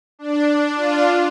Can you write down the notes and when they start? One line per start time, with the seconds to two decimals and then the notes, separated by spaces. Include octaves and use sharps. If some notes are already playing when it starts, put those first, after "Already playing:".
0.19 D4
0.47 D4
0.76 D4 F4